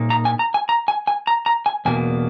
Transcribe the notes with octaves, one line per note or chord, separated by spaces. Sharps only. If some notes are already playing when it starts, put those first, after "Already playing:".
Already playing: A#2 A#3 D#4
A#5
G#5
A#5
G#5
A#5
G#5
G#5
A#5
A#5
G#5
E2 B2 A#3 G#5